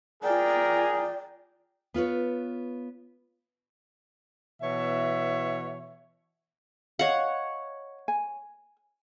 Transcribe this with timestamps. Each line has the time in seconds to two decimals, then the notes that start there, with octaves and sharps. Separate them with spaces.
0.23 F4 G#4 A#4 D5 G5
1.94 B3 F4 B4 C#5
4.61 B2 E3 C#5 E5
6.99 C#5 D#5 F5 F#5
8.08 G#5